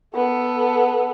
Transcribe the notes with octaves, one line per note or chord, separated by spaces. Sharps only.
B3 A4